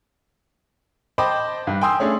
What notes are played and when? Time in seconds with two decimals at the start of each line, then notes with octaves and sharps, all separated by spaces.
1.18 C5 D#5 G5 A5 B5 D6
1.67 G2
1.81 G5 G#5 C6 D#6 E6
2.00 A3 C#4 D4 G#4 C#5